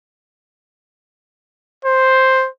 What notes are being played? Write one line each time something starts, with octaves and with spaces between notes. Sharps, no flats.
C5